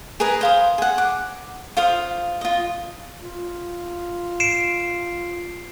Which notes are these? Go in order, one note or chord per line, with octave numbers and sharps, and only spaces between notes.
G#4 A#4 B4 D#5
C5 F5 D#6
G#4 F#5
D6
F4 C5 F5 D#6
F4 D#5
F4
C7 D7 E7